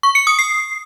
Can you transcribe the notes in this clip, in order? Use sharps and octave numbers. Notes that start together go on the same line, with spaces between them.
C#6
C#7
D#6
C7